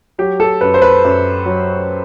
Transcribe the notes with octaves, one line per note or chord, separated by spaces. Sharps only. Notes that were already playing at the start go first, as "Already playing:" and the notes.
F#3 G4
A4
F#2 B4
C5
B4
F#2
F#3